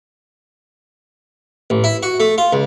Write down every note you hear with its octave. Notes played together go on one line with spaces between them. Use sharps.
A1
E4
F#4
A3
F4
C#2